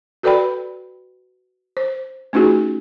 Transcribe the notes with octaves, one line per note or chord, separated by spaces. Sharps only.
F#4 A4 B4 D5 G5 B5
C5
A3 C#4 D#4 F4 F#4 G#4